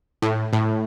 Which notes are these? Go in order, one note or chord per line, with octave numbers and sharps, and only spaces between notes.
A2
A2